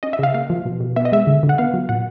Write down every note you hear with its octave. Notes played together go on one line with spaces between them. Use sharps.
C#4 D#5
E5
C#3 F5
A#3 F5
F3
B2
B2
B3 E5
D#5
G#3 E5
D3
D3
F#5
B3 F5
F#3
A#2 F#5